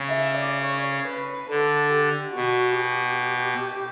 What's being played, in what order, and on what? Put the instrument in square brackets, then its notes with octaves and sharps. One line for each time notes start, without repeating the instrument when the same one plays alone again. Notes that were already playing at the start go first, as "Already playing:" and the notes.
Already playing: [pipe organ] C#3
[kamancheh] E5
D5
C#5
B4
[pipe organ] D3 [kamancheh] A4
[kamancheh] G4
[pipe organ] B2 [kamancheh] F#4
[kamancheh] G4